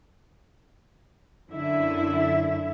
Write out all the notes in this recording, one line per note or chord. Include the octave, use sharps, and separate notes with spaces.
F#2 D3 E4 E5